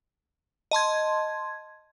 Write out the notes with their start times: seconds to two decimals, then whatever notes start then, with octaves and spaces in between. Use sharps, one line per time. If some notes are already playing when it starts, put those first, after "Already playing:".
0.71 D#5 A5 C6 G#6